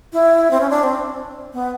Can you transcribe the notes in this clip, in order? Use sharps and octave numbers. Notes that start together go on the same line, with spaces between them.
E4
C4
C#4
D4
C4
B3